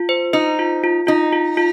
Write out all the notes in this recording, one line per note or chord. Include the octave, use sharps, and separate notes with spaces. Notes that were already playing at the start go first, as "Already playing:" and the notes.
Already playing: F4
C5
D#4 C5
F4
F4
D#4 F4
F4
F4